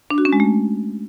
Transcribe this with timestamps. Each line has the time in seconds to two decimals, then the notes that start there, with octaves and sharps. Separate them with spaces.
0.10 D4
0.18 F#4
0.25 C#4
0.33 G#3
0.40 A3